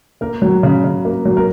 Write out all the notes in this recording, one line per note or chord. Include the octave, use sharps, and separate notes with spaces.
A#3 A#4
F#3
C#3
C#3
A#3
F#3
A#4